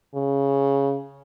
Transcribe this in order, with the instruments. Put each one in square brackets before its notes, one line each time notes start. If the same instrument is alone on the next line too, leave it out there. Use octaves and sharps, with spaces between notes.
[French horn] C#3